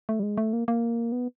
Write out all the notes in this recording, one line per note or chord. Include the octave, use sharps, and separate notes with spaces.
A3
G3
G#3
A3
A#3
A#3
B3